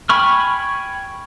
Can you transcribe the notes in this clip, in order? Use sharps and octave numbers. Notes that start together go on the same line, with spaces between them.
G5 G#5 B5 C#6 F6